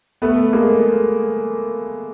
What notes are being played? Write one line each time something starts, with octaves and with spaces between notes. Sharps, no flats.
A3 B3
G#3 A#3